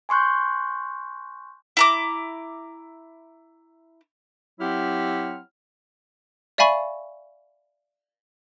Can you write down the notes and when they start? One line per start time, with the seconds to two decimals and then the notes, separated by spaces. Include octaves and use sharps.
0.09 G#5 C6 C#6 F#6 G6
1.77 E4 A#5 D6
4.60 F#3 C4 E4 G4 F#5 F6
6.58 D5 E5 F5 G#5 B5 C#6